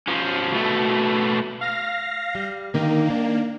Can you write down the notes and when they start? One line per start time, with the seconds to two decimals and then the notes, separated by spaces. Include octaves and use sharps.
0.07 F3 C#4
0.53 B2 A3
1.61 F5 A#6
2.35 G3
2.74 D3 D#3 A#3 D#4
3.10 D#3 D4